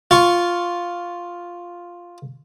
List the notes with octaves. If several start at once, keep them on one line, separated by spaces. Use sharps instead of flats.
F4 C#6